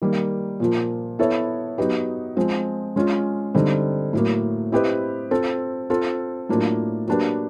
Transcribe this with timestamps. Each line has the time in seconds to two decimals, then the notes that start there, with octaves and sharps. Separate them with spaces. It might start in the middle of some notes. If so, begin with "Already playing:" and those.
0.02 D#3 G3 A#3
0.60 A#2 F3 A#3
1.19 B3 E4 A4 C#5 E5
1.78 F#3 B3 D#4 G4 B4
2.37 F3 G#3 C4
2.96 G#3 C#4 F4
3.54 D3 G3 C4 D#4
4.13 A2 F#3 A#3
4.72 C4 E4 G4 B4 D#5
5.31 C4 F4 A4
5.90 C4 F4 A4
6.49 A2 F#3 A#3 D4 F4
7.07 F#3 A#3 D4 G4 B4